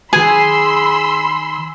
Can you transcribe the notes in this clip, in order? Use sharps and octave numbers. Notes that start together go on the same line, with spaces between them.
D#3 G#4 B4 G#5 B5 C6 E6